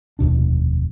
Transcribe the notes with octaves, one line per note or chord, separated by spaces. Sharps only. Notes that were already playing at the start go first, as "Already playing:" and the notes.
F1 D#2 B2 D4